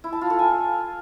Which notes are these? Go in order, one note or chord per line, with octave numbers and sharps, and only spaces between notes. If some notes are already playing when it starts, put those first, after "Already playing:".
E4
A5
F4
A4
G#5